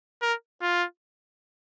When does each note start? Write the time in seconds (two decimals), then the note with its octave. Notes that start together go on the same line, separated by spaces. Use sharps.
0.22 A#4
0.61 F4